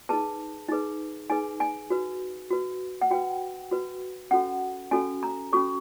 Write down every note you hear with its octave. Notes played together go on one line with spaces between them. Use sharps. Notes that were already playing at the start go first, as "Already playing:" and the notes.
D#4 G#4 B4 A5
D#4 G#4 B4
D#4 G#4 B4 G#5
G#5
F#4 B4
F#4 B4
F#5
F#4 B4 G5
F#4 B4
C#4 F#4 A4 F#5
C#4 F#4 A4 G#5
A#5
C#4 F#4 A4 C#6